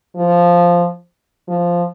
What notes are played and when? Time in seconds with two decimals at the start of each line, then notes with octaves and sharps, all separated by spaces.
0.16 F3
1.48 F3